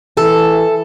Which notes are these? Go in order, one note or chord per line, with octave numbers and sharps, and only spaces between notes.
E3 A4